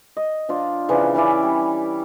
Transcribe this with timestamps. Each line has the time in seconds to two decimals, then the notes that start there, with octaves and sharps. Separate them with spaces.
0.17 D#5
0.49 F3 D4 F4
0.89 C#3 E3 F3 D4
1.14 E3 C#4 E4 D5
1.42 G3